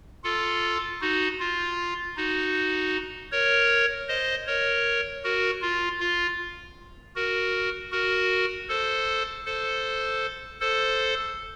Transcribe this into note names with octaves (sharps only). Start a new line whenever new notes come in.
F4 A4
D#4 F#4
F4
D#4 F#4
A#4 C#5
C5 D#5
A#4 C#5
F#4 A#4
F4
F4
F#4 A#4
F#4 A#4
A4 C5
A4 C5
A4 C5